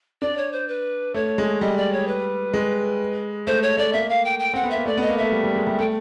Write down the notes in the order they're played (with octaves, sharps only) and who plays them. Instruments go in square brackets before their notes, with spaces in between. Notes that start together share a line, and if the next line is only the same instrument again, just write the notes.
[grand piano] D4 [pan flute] D5
[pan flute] C#5
C5
B4
[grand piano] A3 [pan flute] C#5
[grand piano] G#3
[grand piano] G3 [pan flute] D#5
[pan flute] D5
C#5
B4
[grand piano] G#3
[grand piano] A3 [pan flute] C5
[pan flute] C#5
[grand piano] A3 [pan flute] D5
[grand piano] A#3 [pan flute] E5
[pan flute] F5
G5
G5
[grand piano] C4 [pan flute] F#5
[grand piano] B3
[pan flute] E5
[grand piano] A#3
[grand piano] A3 [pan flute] D5
[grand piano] B3 [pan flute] D#5
[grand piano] A#3
[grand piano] A3 [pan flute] E5
[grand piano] G3
G3
G#3
G3
[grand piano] A3 [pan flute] G5